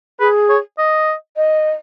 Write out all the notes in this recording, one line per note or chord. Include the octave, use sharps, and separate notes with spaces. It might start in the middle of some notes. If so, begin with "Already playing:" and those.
G#4 B4
C#5
D#5
D#5